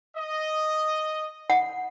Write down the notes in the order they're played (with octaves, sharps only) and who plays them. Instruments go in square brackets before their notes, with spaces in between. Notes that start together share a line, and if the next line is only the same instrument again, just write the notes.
[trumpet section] D#5
[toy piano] F#5